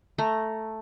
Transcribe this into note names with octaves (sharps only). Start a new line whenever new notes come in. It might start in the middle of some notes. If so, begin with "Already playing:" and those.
A3 A#5